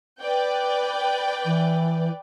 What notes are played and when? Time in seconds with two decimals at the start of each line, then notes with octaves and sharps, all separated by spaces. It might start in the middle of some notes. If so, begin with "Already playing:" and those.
0.21 B4 D5 G5
1.45 E3